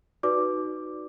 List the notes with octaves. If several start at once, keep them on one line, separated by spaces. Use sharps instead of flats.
D#4 F#4 B4 D5 D6